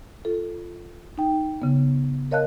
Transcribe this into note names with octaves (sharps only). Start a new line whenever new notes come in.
F4 A4
D#4 G5
C#3 B3
A#4 C#5 D#5 F5 A5 F#6